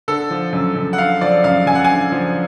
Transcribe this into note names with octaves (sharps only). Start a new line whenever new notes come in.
D3 A4
F3
F#2
F#2
F#5
D3 F5
F3 D5
F#2 F5
F#2 G#5
F#5
D3 G#5
F3